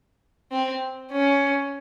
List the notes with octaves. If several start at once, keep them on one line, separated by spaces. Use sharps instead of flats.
C4
C#4